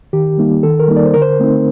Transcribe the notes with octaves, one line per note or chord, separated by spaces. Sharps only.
D#3 G4
G3 A#3 D#4
D#3 A4
A#4
G3 A#3 D#4
D5
C5
D3 A#4
C5
A3 C4 D#4